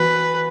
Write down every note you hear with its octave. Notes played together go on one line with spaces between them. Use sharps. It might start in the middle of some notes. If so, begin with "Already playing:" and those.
Already playing: E3 B3 F#4 B4